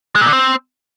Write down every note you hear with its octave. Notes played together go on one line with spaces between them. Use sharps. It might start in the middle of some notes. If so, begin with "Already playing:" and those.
G#3
A#2
D3
C4